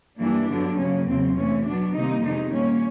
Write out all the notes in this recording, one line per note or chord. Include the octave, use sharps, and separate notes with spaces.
G2 E3 G3 A#3 D4
G2 D3 F#3 B3
C#3 F#3 A#3 C#4
E2 C#3 F#3 C4
C3 E3 A3 C#4
B2 F#3 B3 D4
C3 D#3 G3 A#3 D#4
F2 C3 D#3 G#3 B3 D#4
A#2 G3 A#3 C#4